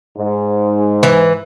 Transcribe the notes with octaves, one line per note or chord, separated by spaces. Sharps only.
G#2
E3